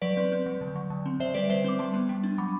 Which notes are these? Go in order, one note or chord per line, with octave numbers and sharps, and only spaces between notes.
F#3 B4 D5
C4
C4
F#3
D3
F#3
D3
C4
D3 C5 E5
G3 B4 D5
D3 C5 E5
C4 D6
G3 A5 C6
B3
G3
D4
F#3 B5 D6